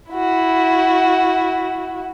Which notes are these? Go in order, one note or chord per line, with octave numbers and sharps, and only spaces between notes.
E4 F#4